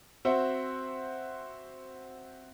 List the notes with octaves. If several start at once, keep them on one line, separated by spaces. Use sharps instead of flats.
C4 F#4 C5 E5 F#5